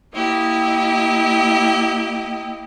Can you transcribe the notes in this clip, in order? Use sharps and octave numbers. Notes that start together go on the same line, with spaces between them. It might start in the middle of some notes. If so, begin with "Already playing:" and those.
A#3 E4 G4 D#5